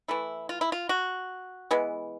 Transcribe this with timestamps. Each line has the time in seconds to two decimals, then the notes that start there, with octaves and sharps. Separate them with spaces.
0.08 E3 A3 E4
0.49 F4
0.61 E4
0.72 F4
0.89 F#4
1.71 E3 G#3 B3